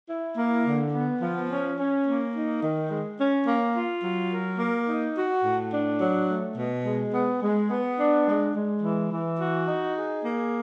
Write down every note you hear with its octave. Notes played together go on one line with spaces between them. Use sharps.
E4
A#3
D3
B3
F3
C#4
C#4
A#3
D#4
D#3
G#3
C#4
A#3
F4
F#3
A#4
A#3
D#4
F#4
A2
D4
F#3
A3
B2
G#3
B3
G#3
B3
D4
G#3
G#3
E3
E3
F#4
D#4
G#4
A#3